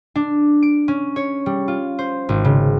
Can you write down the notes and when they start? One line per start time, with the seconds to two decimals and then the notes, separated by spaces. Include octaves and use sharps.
0.15 D4
0.62 D7
0.88 C#4
1.16 C#5
1.46 G3
1.68 F4
1.99 C5
2.29 G#1
2.45 C#3